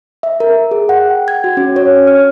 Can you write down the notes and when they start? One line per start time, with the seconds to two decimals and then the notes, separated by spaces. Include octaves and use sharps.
0.23 E5
0.40 A#4
0.71 G#4
0.89 F#5
1.09 G5
1.28 G#6
1.44 F#4
1.57 C#4
1.76 C#5
2.07 F6